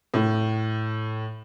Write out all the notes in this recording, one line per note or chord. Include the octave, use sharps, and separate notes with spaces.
A2